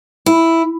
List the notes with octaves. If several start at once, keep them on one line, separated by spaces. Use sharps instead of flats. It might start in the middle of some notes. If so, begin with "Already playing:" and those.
E4